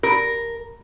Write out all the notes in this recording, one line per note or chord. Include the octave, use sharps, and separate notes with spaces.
A#4